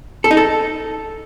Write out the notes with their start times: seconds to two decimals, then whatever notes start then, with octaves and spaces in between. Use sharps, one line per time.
0.24 A4
0.31 D#4
0.37 A4